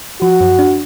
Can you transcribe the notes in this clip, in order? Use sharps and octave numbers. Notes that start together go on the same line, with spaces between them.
F3 F#4
F#2
D4